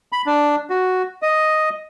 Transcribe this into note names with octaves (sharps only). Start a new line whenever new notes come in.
B5
D4
F#4
D#5